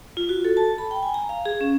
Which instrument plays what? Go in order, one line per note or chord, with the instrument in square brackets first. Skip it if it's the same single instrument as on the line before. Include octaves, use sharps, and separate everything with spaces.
[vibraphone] F4
F#4
A4
A5
B5
G5
G#5
A#5
F5
G#4
C#4